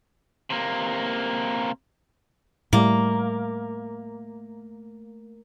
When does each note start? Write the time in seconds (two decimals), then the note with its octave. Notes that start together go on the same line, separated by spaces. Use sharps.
0.50 C3 A#3
2.73 A2 G3 A3 A#3